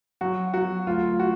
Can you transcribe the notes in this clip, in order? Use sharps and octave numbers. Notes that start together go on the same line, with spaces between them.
F#3 F#4
F#3 F#4
D2 F4
F#4